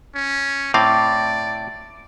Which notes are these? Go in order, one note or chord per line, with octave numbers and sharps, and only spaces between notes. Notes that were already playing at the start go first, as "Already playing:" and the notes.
C#4
A2 C4 D5 F5 D6